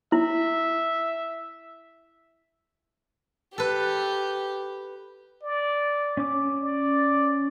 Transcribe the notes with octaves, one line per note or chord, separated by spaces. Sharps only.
E4 E5
G4 A4 B4
D5
C#4 D6
D5